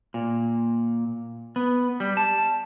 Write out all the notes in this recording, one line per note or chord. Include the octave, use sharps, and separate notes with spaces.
A#2
B3
G3
A5